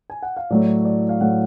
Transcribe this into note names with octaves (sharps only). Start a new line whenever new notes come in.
G#5
F#5
F5
A2 F#3 A3 D5
C#5
D5
F5
A2 F#3 A3 F#5